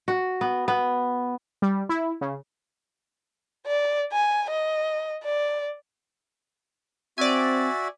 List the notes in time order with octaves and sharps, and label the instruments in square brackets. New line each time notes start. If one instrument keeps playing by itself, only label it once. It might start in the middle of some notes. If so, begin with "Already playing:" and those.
[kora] F#4
B3
B3
[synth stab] G3
E4
C#3
[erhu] D5
G#5
D#5
D5
[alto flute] C4 [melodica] F#4 E5 [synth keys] D5 G#5